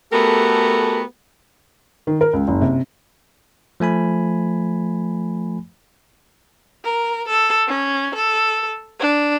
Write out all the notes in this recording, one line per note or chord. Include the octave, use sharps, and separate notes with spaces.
A3 B3 F#4 G4 A4 A#4
D#3
A#4
C#2
F#1
C3
F3 A3 G#5 B5
A#4
A4
C#4
A4
D4